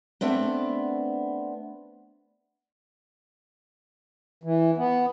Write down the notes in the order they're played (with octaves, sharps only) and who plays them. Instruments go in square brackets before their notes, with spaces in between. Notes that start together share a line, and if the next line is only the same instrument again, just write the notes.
[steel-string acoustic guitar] A3 B3 C4 D4
[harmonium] E3
B3